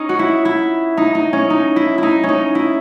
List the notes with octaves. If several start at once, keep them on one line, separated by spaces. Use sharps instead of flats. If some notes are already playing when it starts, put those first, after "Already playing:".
Already playing: C#4 D#4
F#4
E4
E4
D#4
D#4
C#4
D#4
E4
D#4 E4
C#4
D#4
E4